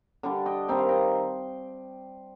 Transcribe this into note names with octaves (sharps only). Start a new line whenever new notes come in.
D3 G3 D4
D#5 G5
D#3 G3 C4 D#4 G5
F5
D#5 G5